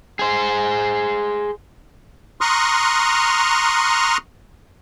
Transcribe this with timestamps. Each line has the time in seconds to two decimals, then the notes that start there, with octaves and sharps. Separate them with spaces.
0.19 G#4 C5
2.41 A#5 C6 C#6 D#6 F6 F#6